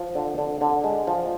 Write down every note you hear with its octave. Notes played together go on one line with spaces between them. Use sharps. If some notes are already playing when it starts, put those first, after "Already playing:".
Already playing: F3
D3
D3
D3
G#3
F3